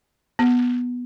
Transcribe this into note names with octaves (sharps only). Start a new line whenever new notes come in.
B3